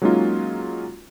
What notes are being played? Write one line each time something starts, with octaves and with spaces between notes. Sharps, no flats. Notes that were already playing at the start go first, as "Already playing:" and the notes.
F#3 G#3 A#3 C#4 D#4 F4